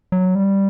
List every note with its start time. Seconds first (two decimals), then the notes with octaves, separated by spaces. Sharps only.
0.12 F#3
0.35 G3